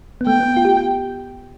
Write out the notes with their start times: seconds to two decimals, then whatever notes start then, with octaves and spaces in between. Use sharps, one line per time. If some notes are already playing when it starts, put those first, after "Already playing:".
0.21 B3
0.27 A3 G5
0.40 B3
0.57 F4
0.65 G4